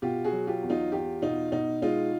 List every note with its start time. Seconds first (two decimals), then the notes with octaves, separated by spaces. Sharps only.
0.02 B2 F4 G4
0.24 F#4 G#4
0.32 F#3
0.47 F4 G4
0.63 E2
0.70 D#4 F4
0.92 E2 F4 G4
1.22 B2 D#4 F4
1.52 B2 D#4
1.82 G#3 D#4 F4